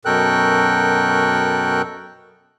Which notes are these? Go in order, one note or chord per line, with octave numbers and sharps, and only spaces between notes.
F#2 B2 A4 A#4 G5 F#6